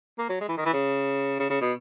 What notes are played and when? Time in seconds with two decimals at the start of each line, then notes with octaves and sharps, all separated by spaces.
0.19 A#3
0.29 F#3
0.40 G#3
0.49 E3
0.57 D#3
0.65 E3
0.73 C#3
1.39 C#3
1.50 C#3
1.61 B2